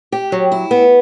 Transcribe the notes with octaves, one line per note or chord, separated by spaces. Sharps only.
G4
F#3
E4
B3